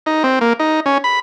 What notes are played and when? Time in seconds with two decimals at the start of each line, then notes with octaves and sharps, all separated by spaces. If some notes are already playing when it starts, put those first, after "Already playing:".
0.06 D#4
0.24 C4
0.41 A#3
0.59 D#4
0.86 C#4
1.04 B5